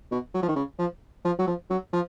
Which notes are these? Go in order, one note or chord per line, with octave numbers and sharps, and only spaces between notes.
B2
F#3
F3
D#3
C#3
F3
F3
F#3
F3
F#3
F3